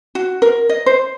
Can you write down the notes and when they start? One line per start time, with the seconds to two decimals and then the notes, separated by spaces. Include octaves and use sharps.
0.15 F#4
0.42 A#4
0.69 D#5
0.86 C5